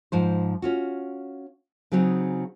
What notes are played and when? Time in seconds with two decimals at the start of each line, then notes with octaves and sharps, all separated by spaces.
0.12 G#2 F3 C5
0.62 C#4 F4 F#4
1.92 C#3 F#3 C4 D#4 G#4